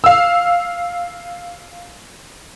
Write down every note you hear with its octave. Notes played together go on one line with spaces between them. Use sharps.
F5 E6